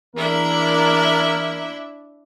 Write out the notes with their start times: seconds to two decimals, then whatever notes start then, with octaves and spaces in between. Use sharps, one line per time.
0.15 E2 A#3 D4 E4 A#4 E5